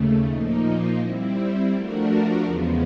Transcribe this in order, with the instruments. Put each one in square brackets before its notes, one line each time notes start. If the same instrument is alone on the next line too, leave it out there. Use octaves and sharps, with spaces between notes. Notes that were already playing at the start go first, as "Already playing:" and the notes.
Already playing: [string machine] D#2 C#3 A3
A#2 F3 A#3 D#4
G3 C4 E4
F3 A3 D4 F#4 A#4
E2 C#3 F3 G#3 B3